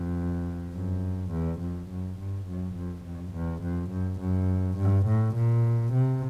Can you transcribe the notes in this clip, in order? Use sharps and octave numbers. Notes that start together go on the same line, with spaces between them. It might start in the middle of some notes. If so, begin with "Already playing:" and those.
Already playing: F2
F#2
E2
F2
F#2
G2
F#2
F2
F2
E2
F2
F#2
F#2
G2
A2
A#2
C3